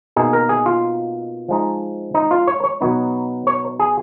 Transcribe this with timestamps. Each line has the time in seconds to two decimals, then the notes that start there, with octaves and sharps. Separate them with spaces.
0.16 B2 A#3 D#4 G#4
0.33 A#4
0.49 G#4
0.66 F4
1.48 F3 G#3 D#4
2.14 D#4
2.31 F4
2.47 C#5
2.64 C#5
2.81 B2 F#3 B3 D#4
3.47 C#5
3.79 G#4